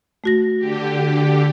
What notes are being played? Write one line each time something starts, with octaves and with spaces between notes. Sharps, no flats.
A3 F#4 A#6
D3 G4